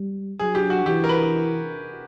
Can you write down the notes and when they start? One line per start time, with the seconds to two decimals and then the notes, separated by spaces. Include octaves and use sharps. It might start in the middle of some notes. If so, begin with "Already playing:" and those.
Already playing: G3
0.39 F#3 G#4
0.55 G4
0.70 F#4
0.86 E3 G4
1.04 A#4
1.09 B4